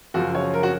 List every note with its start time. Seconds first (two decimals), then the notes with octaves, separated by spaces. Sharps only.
0.14 F#2 C#3 F3 F#4
0.35 C#5
0.54 A#4
0.63 F#4